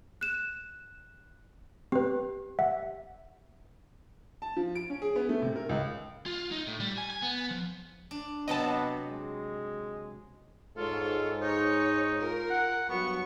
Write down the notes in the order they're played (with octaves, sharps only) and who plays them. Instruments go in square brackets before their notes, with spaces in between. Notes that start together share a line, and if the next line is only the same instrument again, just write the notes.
[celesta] F#6 E7
[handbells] C4 B4 [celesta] G4
[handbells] E5 F#5
[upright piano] A5
F3
D7
C#4
G#4
B3
A3
C3
A#4
C#2
[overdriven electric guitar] F4
D#4
A2
G3
G#5
G#5
B3
F3
[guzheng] D4
[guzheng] C3 F#3 G4 [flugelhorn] B3 [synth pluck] D#5 A5
[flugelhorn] G#3
[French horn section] G#2 [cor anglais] F4 [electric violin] A4 C#5
[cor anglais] D#4 [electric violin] C#5
[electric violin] F4 A#4
[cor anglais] F#5
[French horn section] G2 F#3 [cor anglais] B3 [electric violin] C#6